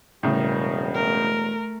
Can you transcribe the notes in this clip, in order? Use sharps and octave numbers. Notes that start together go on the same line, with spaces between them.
E1 A2 C#3 G3 A#4
A3 A#4